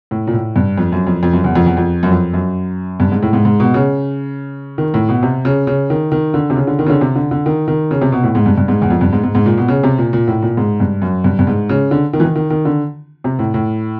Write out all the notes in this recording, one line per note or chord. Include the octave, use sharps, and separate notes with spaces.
A2
A#2
A2
G2
F2
F#2
F2
F2
F#2
E2
F2
E2
F2
F#2
F2
F#2
G2
G#2
A2
G#2
G#2
B2
C#3
D#3
A2
B2
C3
C#3
C#3
D#3
D#3
D3
C3
C#3
D3
D#3
C#3
D3
C3
D3
D3
D#3
D#3
C#3
C3
B2
A2
G#2
G2
G2
G#2
E2
F2
G2
G#2
G#2
G#2
A#2
B2
C#3
C3
A#2
A#2
A2
A#2
G#2
G2
F#2
G2
G2
G#2
C#3
D3
D#3
E3
D#3
D#3
D#3
D3
C3
A2
A2